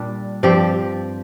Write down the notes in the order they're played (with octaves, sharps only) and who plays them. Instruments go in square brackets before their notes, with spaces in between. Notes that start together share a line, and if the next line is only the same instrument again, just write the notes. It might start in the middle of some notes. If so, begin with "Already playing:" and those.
Already playing: [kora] A#2 G3 D4
G2 F3 C4 G4